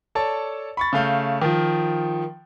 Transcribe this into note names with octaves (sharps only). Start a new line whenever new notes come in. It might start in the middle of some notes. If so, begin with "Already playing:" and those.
A4 C#5 D5 A5
B5 C#6 A6
C#3 A3 F5 G6
D#3 F3